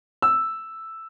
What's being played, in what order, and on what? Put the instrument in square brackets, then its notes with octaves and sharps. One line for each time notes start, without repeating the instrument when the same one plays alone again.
[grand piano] E6